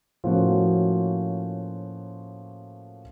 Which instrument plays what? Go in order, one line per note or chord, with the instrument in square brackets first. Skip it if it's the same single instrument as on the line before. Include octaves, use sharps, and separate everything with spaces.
[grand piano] A2 F3 A#3 C#4 F#4